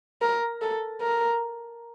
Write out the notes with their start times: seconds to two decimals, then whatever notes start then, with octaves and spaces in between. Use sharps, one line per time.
0.21 A#4
0.61 A4
1.01 A#4